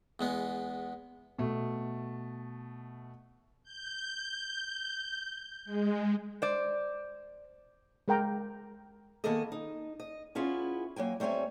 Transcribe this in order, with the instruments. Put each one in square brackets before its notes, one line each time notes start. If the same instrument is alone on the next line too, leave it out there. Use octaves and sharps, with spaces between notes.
[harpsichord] E2 G#3 B3
[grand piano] B2 A3
[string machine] G6
G#3
[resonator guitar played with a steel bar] C5 D5
[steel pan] G#3 A#4 G5 A#5
[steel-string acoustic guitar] D#3 A#3 B3 G#4 A4 D#5
D#4
D#5
B3 C#4 E4 F4 G#4
F#3 A#3 G5 G#5
G3 A3 C4 C#5 G#5